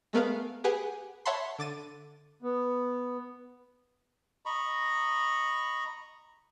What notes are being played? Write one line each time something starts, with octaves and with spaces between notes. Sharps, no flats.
G#3 A3 B3 A#4 B4 F5
G4 G#4 B4 F#5 G#5
C#5 E5 F#5 A5 B5 C6
D3 D6 A6 D#7
B3
D#5 A#5 B5 C#6